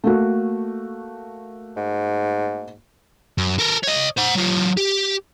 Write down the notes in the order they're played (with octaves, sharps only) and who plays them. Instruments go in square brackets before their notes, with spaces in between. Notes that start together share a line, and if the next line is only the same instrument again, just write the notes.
[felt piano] A3 A#3 F#4
[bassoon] G#2
[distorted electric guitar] F#2
A4 A#4
C#5 D#5
C5 F#5
F#3 F4
G4